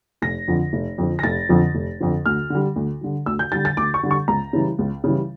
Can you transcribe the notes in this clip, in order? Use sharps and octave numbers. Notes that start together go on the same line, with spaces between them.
F1 A#6
F2 D3 F3
F1
F2 D3 F3
A#6
F1 A6
F2 D3 F3
F1
F2 D3 F3
D2 F6
D3 G3
D2
D3 G3
D2 E6
G6
D3 G3 A6
A6
D2 D6
C#6
D3 G3
C#6
C#2 A#5
C#3 E3 G3
C#2
C#3 E3 G3